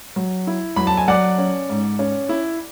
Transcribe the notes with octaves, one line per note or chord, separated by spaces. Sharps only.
F#3
E4
F#3 B5
A5
G#5
F#3 D5 F#5
C#4
G#2
C#4
E4